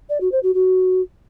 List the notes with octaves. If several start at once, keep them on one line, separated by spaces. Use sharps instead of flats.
D5
F#4
C5
F#4
F#4